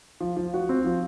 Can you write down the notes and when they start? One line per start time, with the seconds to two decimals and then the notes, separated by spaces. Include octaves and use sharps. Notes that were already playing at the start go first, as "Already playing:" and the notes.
0.21 F3
0.37 F3
0.54 F#4
0.69 C4
0.85 F3